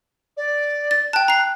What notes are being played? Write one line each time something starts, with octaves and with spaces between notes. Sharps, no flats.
D5
A6
G5 A5 F#6
A#5 C7